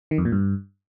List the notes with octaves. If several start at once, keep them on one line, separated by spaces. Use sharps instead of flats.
D#3
F2
A#2
G2